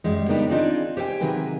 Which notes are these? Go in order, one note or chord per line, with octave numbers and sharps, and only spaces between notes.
F#2 G3 G#3
C#3 B3 D4 D#4 G4 A#4
C4 D4 D#4 F4 G#4 D5
G4 C5 C#5 E5 G5 G#5
C3 D#3 F#3 G#4 B4 G#5